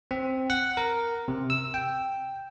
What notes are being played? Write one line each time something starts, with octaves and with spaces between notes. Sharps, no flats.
C4
F#5
A#4
C3
E6
G5